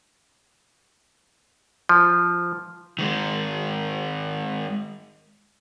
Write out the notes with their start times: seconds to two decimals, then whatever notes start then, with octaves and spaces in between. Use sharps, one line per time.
1.89 F3
2.99 D#3 G#3